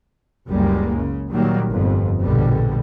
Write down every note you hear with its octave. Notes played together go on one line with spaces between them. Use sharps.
F#1 C#2 F#2 G3 G#3 A#3
C#3
A#2 D#3 F#3 G3 A#3
G1 F2
A#1 B2 D3 G3